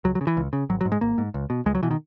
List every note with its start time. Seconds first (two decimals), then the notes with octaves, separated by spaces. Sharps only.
0.04 C#2 F#3
0.15 F#3
0.21 C#3
0.27 E3
0.37 C#2
0.53 C#3
0.69 G#1 F#3
0.81 F#3
0.85 G#2
0.92 G#3
1.01 G#1 A#3
1.18 G#2
1.34 C#2
1.50 B2
1.66 C#2 G#3
1.75 F#3
1.83 B2 E3
1.91 D#3